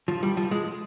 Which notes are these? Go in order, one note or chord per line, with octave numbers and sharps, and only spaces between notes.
F3
G3
F3
G#3